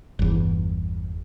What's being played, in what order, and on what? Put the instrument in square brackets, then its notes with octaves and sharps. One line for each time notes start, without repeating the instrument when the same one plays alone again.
[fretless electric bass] G1 E2